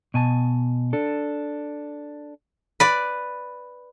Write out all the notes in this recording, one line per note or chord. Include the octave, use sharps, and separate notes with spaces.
B2 G#5 A5
D4 A4
B4 D5